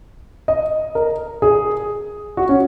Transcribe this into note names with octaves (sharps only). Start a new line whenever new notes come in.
D#5
A#4
G#4
F#4
C#4